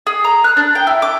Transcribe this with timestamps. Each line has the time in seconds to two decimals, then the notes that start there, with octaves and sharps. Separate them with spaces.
0.07 G#4
0.24 A#5
0.44 F#6
0.57 D4
0.75 G5
0.87 E4
1.02 D6